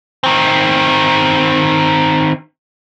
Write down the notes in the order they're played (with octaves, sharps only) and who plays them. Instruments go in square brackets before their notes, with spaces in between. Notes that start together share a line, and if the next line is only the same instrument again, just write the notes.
[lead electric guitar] D#3 C4